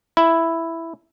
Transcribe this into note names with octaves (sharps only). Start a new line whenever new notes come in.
E4